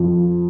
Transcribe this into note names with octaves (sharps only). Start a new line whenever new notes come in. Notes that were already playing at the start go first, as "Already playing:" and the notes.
Already playing: F2